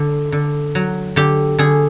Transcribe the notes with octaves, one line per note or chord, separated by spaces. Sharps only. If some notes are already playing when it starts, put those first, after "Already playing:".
Already playing: D3
D3
F#3
D3 G4
D3 G#4